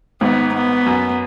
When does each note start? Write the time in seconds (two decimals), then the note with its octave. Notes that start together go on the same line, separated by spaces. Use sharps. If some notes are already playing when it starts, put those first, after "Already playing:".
0.21 G#1 G#2 B3
0.55 B3
0.86 F#2